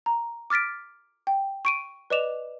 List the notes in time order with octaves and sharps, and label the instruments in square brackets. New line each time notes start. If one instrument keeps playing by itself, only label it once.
[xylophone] A#5
D6 F6 A6 B6 D7
G5
C#6 D7 D#7
B4 D5 D#5 D6 E7 F7